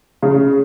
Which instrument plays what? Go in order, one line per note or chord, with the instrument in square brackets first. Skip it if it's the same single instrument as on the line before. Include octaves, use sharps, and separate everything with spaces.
[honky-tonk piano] C#3